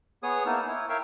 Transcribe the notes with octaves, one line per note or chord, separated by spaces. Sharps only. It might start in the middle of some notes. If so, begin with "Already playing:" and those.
B3 G#4 C#5 D#6
A#3 B3 D#4 E4 A5 F6
E4 C#5
A#4 C#5 E5 F5 G5